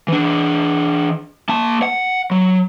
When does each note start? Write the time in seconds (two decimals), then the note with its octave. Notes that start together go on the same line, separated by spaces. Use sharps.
0.08 E3 D4
1.49 A#3 A5
1.83 F#5
2.31 F#3